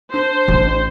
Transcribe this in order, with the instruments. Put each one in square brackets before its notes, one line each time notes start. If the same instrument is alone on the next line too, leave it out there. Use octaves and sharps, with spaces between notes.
[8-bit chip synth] D4 [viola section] C5
[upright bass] A1